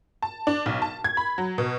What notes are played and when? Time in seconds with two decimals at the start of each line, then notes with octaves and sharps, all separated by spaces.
0.22 A5
0.47 D4
0.66 B1
0.82 A5
1.04 G#6
1.17 B5
1.38 F#3
1.58 B2